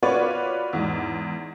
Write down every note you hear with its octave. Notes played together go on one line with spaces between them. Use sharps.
B3 F4 F#4 B4 C#5 D5
E2 G#2